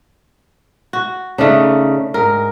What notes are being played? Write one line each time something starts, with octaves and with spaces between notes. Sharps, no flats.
F#4
C#3 A3 D4 D#4
G#2 A#4